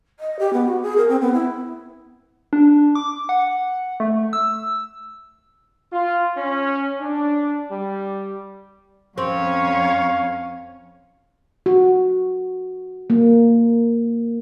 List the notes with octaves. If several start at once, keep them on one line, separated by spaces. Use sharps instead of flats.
D#5
G4
B3
F#4
G#4
A#4
C4
B3
E4
D4
D6
F#5
A3
E6
F4
C#4
D4
G3
F2 C4 C#4 C#5 F5
F#4
A#3